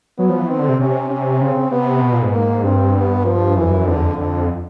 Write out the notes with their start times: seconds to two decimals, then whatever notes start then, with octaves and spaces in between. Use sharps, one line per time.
0.18 F#3 B3
0.29 F3
0.39 E3
0.48 D#3 C4
0.59 D3
0.69 C3
0.79 C3 C#4
1.10 C#4
1.41 C#3 C4
1.56 C#3
1.71 C3 B3
2.02 B2
2.13 A#2
2.22 G#2
2.33 A#3
2.63 G2 C4
2.95 B3
3.25 F3
3.56 F#2 E3
3.63 F2
3.70 F#2
3.87 F2 D3
3.95 E2
4.03 F2
4.17 F2 D3